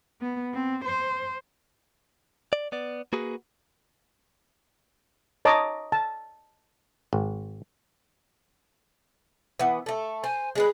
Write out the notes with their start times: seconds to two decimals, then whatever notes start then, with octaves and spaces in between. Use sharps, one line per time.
0.21 B3
0.53 C4
0.85 C5
2.53 D5
2.72 B3 D5
3.13 A#3 F#4 G#4 B4
5.45 C#5 D#5 A5 A#5 D6
5.92 A5
7.13 G#1
9.59 E3 B3
9.86 A3 A4
10.24 C5 G#5
10.56 G#3 D4 G#4 B4